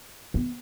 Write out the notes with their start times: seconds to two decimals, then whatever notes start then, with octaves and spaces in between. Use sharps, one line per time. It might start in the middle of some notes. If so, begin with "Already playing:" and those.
0.34 B3